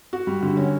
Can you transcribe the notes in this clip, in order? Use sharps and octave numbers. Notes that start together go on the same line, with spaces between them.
F#4
G3
D3
C#4